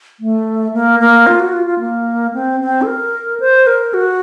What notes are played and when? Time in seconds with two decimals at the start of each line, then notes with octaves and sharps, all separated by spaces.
0.20 A3
0.74 A#3
1.00 A#3
1.27 F4
1.40 F#4
1.53 F4
1.66 F4
1.79 A#3
2.34 C4
2.60 C4
2.82 A4
2.87 A#4
3.40 C5
3.67 A#4
3.94 F#4